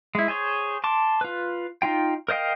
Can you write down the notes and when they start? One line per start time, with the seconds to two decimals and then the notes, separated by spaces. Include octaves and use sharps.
0.15 G#3 E4
0.28 G#4 C5 C#5
0.84 A5 C6 D6
1.21 F4 B4
1.82 D#4 F4 G5
2.28 A#4 C5 D#5 F5 G5